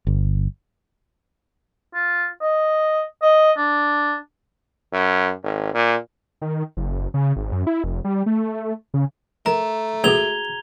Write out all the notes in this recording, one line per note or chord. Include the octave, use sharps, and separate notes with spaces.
G1
F4
D#5
D#5
D4
F#2
G#1
A#2
D#3
F#1
C#3
G#1
F#2
E4
F1
G3
A3
C#3
A3 A#4 A#5
C#2 B2 F#4 G#4 G#6 F7 G7